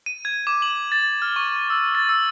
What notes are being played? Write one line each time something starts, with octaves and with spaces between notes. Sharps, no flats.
D#7
G#6
D6
F#7
A6
F6
C#6
E6
A6
E6